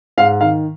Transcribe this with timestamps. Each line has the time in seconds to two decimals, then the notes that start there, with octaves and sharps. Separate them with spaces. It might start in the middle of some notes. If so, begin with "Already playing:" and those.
0.17 G#2 F5
0.41 D#3 F5